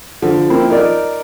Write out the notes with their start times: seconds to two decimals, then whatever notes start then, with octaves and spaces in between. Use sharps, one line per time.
0.22 D3 F3
0.50 A#3 C4 E4
0.70 D#4 A#4 D5